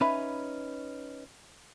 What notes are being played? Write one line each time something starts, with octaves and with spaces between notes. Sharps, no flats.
C#4 D#4 B4 E5 B5